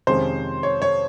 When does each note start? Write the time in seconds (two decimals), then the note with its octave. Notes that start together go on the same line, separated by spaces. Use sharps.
0.07 F2 C3 D#3 G#3 C#4 C5
0.63 C#5
0.82 C#5